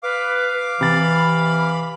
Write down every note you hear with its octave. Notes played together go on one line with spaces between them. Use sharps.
B4 F5 D6
C3 E3 B5 A6